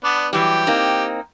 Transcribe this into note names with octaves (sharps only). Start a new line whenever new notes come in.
B3 D4 D5
E3 F#3 G3 G4
A#3 C4 D#4